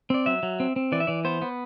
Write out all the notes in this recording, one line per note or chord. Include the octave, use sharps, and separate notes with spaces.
C4 D5
F#3 E5
F#3
C4
C4
E3 D5
E5
E3 D5
B3 C5
B3